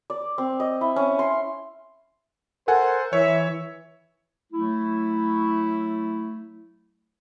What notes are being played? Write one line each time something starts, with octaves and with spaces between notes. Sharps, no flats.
D5
C4
D#5
E4
C#4
C6
A4 A#4 C5 F#5 G#5
E3 C#5 E5
F#3 A3 E4